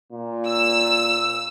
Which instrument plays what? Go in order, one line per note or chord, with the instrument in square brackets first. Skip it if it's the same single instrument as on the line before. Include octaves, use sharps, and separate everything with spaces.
[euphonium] A#2
[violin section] E6